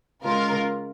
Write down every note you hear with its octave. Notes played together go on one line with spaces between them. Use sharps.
C#3 G#3 F4 A#4